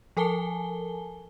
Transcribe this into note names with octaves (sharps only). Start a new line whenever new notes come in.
F3 A4 A#4 G#5 A5 G7